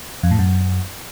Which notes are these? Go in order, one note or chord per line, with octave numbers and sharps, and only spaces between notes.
F2
A2
F#2